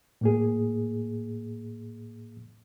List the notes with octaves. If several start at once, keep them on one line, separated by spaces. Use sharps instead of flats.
A2 A#3 G#4